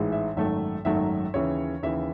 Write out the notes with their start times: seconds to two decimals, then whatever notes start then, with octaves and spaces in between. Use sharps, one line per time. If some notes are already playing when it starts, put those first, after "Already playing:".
Already playing: A1 G#2 E3 G#3
0.12 E5
0.37 G#1 F#2 D#3 F#3 A3 E5
0.85 G#1 F#2 D#3 F#3 A3 E5
1.34 D#2 C#3 E3 C#5
1.83 D#2 C#3 E3 E5